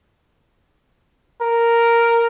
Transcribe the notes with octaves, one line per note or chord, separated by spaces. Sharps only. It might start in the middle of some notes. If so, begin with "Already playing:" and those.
A#4